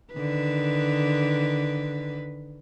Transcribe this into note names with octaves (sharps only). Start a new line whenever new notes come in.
D3 D#3 B4